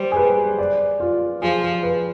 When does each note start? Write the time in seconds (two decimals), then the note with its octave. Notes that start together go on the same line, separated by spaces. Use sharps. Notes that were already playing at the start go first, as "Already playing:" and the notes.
Already playing: G3 C5
0.12 G#4
0.17 B4
0.59 D5
1.00 F4
1.42 F3 G#4
1.62 G#4
1.83 B4